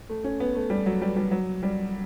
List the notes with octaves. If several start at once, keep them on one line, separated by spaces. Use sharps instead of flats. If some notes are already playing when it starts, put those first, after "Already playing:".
A3
C#4
B3
A3
G3
F#3
G3
G3
F#3
G3